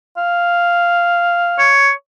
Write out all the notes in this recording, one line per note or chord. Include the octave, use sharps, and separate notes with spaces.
F5
C#5